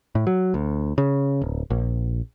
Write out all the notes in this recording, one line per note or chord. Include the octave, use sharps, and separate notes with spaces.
A2
F#3
D2
C#3
D1
A#1